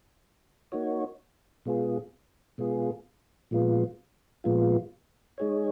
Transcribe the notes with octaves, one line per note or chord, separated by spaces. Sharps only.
A#3 D#4 F#4 C#5
B2 G#3 B3 F4 G#4
B2 G#3 B3 F4 G#4
A#2 F3 G#3 B3 F4
A#2 F3 G#3 B3 F4
G#3 D#4 G#4 C#5